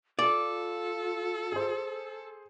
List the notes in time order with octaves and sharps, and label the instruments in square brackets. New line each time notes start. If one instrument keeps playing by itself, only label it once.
[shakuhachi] F4 [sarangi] A4 [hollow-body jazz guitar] D5
[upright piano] G#4 C5